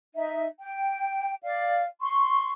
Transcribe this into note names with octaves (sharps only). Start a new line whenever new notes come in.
D#4 E5
G5
D5 F5
C6 C#6